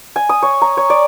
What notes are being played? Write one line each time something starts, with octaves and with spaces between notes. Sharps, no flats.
G#5
D#6
C#5
A#5
C#5
D5